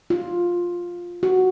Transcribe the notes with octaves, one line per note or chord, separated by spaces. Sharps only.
F4
F#4